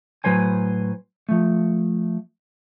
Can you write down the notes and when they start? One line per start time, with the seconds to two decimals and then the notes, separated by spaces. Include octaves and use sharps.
0.24 A2 F#3 B4 C5 G#5
1.29 F3 A3